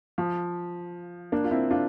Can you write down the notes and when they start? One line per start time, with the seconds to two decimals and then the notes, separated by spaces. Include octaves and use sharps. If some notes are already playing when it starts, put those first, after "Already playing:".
0.18 F3
1.32 A#3 D4
1.44 F4
1.51 C4 E4
1.70 D4 F4